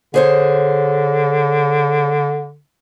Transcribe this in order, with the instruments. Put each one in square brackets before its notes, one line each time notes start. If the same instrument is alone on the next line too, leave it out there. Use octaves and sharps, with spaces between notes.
[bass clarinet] D3 [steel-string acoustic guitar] G#4 C5 C#5